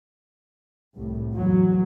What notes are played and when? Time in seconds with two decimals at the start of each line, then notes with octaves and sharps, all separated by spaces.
0.95 C2 A2
1.34 E2 F#3